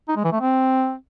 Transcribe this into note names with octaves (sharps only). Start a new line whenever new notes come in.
D#4
G#3
E3
A3
C4